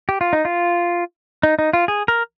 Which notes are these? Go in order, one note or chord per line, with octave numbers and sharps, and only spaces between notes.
G4
F4
D#4
F4
D#4
D#4
F4
G#4
A#4